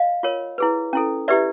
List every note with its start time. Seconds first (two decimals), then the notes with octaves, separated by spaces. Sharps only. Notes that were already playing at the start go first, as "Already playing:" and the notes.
Already playing: D#5 F5
0.23 F4 A#4 C#5
0.58 E4 G#4 B4
0.93 C#4 E4 A4
1.28 E4 G4 B4 D5 E5